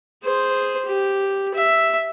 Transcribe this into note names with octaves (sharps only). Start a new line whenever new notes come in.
G#4 C5
G4
E5